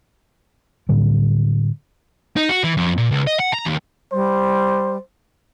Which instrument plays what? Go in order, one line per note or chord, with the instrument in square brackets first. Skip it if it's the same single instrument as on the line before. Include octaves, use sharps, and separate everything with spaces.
[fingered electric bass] A2 D3 G3
[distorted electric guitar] D#4
F#4
E3
F2
A#2
C#2
D#5
F#5
A#5
D#2
[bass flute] G3 [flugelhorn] C5